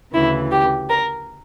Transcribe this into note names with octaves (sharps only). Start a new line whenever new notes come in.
D2 C#3 E3 E4
G4
A#4